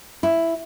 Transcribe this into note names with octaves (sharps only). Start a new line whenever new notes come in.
E4